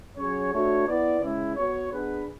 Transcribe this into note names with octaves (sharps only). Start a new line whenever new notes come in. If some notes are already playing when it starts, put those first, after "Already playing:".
F#3 C#4 G#4 C#5
A3 D4 F#4 C#5
B3 E4 B4 D5
C#3 G#3 C#4 E4
B3 F#4 C#5
B3 D4 G#4 B4